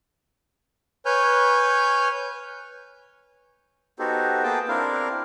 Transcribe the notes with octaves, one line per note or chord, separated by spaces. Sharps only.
B4 C#5 G#5 F6 G6
B3 D#4 F#4 G4 A4 C5
A#3 B3 G#4 A4 G5 A5
C4 D4 E4 A#4 F5